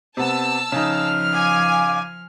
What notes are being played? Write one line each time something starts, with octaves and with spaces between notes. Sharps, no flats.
C3 B3 A5 E6
C#3 F3 D#4 F6
F5 G#5 D6